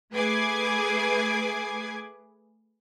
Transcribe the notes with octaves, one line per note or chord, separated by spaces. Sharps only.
A3 G#4 B4 D6 G#6 C7